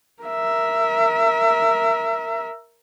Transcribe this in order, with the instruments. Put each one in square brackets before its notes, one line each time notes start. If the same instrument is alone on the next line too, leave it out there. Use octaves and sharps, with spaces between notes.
[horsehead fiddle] A#4 E5